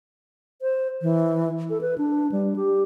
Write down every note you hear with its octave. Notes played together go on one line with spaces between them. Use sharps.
C5
E3
A4
B4
D4
G3
G4